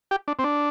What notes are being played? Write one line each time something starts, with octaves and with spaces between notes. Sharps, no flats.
G4
D4
C4
D4